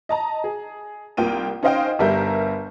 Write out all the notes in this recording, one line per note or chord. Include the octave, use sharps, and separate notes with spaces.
D#5 A5 A#5
G#4
C2 A#3 F4 G5 D#7
C#4 D#4 C5 D#5 F5 G5
G1 G3 A#4 E5 G6